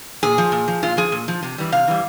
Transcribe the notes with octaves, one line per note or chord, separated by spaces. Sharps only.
A#2 G#4
F3
A#2
F3
A#2 F4
F3 G#4
A#2
F3
C3
E3 G3
C3 F5
E3 G3